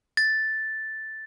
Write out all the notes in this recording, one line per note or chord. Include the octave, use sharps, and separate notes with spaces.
A6